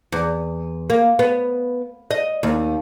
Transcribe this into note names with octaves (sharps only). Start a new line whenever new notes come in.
E2
A#3
B3
D#5
D#2